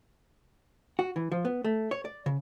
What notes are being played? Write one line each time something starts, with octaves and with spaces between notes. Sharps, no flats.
F#4
E3
F3
B3
A3
C#5
D5
C#3